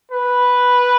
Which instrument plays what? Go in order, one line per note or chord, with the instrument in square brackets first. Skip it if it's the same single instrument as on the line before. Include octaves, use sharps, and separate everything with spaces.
[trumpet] B4